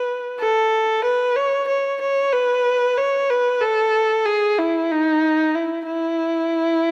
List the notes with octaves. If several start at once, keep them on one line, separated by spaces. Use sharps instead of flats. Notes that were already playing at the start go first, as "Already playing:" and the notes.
Already playing: B4
A4
B4
C#5
C#5
C#5
B4
C#5
B4
A4
G#4
E4
D#4
E4
E4